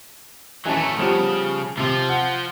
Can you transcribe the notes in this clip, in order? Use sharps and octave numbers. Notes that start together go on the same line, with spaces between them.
E3 F#3 A3 C#4 A5
A#5
C#3 F3 G3 B3
C3 F3 F4
F#5